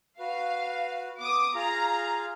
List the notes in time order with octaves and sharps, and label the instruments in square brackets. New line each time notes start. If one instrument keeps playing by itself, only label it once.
[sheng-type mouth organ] F#4 B4 [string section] F5
[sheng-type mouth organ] B3 [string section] D6 D#6
[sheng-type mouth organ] F4 G#4 F5 [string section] A#5